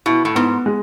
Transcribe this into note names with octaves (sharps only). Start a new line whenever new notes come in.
B2 E4
A2
G#2 B3
G#3